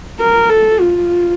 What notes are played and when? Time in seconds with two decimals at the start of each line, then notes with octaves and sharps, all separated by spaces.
0.20 A#4
0.49 A4
0.80 F4